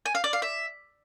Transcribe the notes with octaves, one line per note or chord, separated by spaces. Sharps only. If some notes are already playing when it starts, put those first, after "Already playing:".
G#5
F5
D5
F5
E5